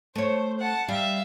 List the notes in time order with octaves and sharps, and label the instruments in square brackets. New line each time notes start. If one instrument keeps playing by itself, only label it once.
[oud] A3 C#5 [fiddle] C5
[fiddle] F#5 A5
[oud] G3 [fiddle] E5 F5